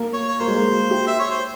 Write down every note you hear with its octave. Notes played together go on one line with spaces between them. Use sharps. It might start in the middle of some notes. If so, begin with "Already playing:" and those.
Already playing: A#3
C#5
C#5
A#3 C5
G#3
A#3
G4
E5
C#5
C5